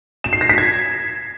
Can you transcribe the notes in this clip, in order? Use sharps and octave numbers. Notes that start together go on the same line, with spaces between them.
E7
C7
A#6
B6
G#6